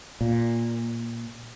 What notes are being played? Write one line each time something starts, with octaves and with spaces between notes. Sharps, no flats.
A#2